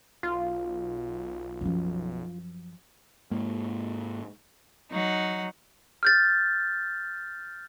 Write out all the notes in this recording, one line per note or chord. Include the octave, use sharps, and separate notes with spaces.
B1 F4
F#2 F3
G#2 A#3
F#3 D#4 F#5
F6 G6 A6